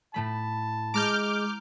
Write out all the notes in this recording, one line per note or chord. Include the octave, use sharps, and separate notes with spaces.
A2 A3 A5 B5
G#3 A#5 D6 F6 G6